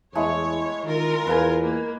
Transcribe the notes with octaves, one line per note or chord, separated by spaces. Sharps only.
E2 G#3 A3 E4 C#5
D#3 F4 A#4
E2 B4 F5 G#5
A#3